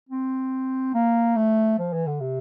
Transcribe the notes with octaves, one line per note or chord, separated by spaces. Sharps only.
C4
A#3
A3
F3
E3
D3
C3